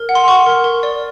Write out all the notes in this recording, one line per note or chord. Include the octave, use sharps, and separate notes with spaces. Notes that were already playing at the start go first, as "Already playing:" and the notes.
Already playing: A#4
F#5
C6
F#5 C#6
A#4
A#4
D5